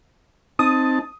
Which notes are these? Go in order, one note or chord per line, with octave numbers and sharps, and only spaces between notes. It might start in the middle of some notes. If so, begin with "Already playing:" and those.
C4 D#4 A5 D#6